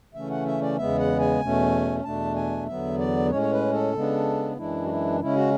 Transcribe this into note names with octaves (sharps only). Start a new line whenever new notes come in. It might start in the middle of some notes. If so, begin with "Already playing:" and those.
C#3 E3 A3 C#4 E5
F#5
E5
D5
E2 C#3 G#3 B3 E5
F#5
G#5
E2 B2 A3 C#4
E2 B2 A3 D4 A5
G#5
E2 D3 F#3 B3 E5
D5
A2 G#3 C#4 C#5
C#5
B4
A4
C#3 G#3 B3 D4
F#2 E3 G#3 D4 E4
F#4
E4
C#3 G#3 C#4 E4
F#4